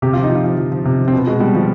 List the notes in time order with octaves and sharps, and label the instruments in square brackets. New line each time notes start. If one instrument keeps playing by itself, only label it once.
[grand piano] C3 G4
F3 F4
D#4
F3
F4
F3
F3
F3
C3
F3
C4
B2 B3
B2 G#3
B2 G3
B2 F3